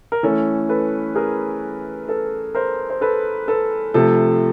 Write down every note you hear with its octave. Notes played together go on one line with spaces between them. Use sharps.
A#4
E3 A3 C#4 A4
A4 B4
G#4 A#4
A4 B4
A#4 C5
C5
A4 B4
A4 B4
C3 F3 A3 A4